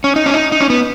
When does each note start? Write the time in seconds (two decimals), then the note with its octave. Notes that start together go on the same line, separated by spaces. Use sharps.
0.04 C#4
0.16 D#4
0.26 C#4
0.34 D#4
0.52 D#4
0.61 C#4
0.70 B3